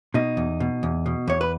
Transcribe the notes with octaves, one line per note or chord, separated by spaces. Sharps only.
B2 D#4
E2
B2
E2
B2
E2 C#5
B4